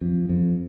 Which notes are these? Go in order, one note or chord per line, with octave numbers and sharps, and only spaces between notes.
F2
F2